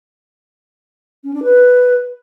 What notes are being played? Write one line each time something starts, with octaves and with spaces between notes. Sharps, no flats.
C#4
D4
B4